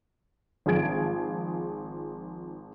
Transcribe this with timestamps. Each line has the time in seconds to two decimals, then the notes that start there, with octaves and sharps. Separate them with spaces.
0.66 G#1 F3 G#4 G#6 D7